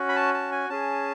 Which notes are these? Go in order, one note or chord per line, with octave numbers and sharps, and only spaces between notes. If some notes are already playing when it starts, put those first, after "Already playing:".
Already playing: C#4 F#4
B5
A5
A5
G#5
C#4 G#4 A5